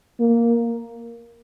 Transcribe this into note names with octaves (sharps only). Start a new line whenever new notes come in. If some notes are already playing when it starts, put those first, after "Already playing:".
A#3